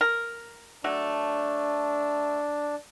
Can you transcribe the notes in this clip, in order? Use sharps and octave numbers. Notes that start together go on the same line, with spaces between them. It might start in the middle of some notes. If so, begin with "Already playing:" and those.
A#4
F#3 A3 D4